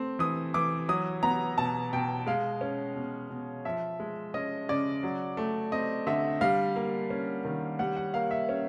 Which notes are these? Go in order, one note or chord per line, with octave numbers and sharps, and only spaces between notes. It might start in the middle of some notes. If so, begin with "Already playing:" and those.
Already playing: A3 C4
E3 D#6
E3 D6
F#3 D#6
B3 A#5
B2 A5
B2 G5
G#3 F5
C#4
B2
B2
F3 E5
G#3
C#4 D#5
C#3 D5
F#3
A3
C4 D#5
D3 E5
G3 F5
A#3
C#4
D#3
G3 F#5
F#5
A#3 F5
E5
C#4